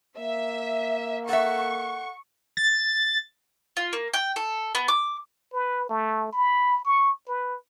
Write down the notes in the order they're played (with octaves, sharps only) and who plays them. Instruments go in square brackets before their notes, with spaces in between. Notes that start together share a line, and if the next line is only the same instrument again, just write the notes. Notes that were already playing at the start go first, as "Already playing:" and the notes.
[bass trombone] A#3 [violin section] E5
[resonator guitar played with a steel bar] A4 E5 [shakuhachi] F#5 [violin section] C#6
[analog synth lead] A6
[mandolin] F4
A#3
G5
A4
B3
D6
[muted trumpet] B4
A3
B5
C#6
B4